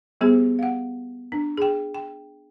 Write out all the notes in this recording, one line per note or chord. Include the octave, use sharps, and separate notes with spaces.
G3 B3 G4 G#4 C5
F5 F#5
D4
G#4 G5
G5